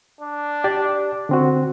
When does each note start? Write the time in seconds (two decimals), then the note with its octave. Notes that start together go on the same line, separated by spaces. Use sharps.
0.20 D4
0.64 G4 D5 D6
1.29 D3 C4 F#4